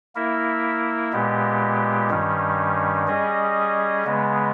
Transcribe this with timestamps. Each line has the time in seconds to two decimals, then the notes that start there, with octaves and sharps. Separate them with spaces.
0.15 A#3 E4 A#4 E5
1.13 A#2 G#3 B3 G4
2.10 G2 D#3 G3 C#4
3.07 G3 C#4 G#4 D#5
4.05 C#3 G#3 B3